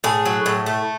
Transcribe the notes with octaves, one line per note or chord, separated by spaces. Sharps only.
A2 G#4
F#3
A2
A3